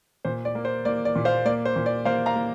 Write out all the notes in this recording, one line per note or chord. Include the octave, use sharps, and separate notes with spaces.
A#2 C5
D5
A#3
C5
A#3 D5
D5
A#2
C5 F5
A#3 D5
C5
A#2
D5
A#3 C5 F5
F5 A#5
A#3